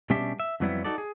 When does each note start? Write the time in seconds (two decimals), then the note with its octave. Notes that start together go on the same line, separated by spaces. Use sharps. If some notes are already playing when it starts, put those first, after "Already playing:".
0.10 B2 G3 C#4 D4 G4 E5
0.40 E5
0.60 F2 E3 F#3 G3 B3 E4
0.84 D#4 F#4 A4 D5
0.98 G#4